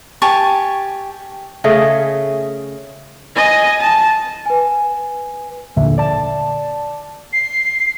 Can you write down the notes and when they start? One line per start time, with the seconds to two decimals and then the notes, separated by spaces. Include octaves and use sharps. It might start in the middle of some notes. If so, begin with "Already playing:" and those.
0.22 G4 G#5 A5 C#6
1.64 C#3 A3 G#4 D#5
3.36 D#5 G#5
3.81 A5
4.46 B4 G#5
5.76 A#1 D#2 A#2 D3 E5
5.98 D5 A5
7.33 C7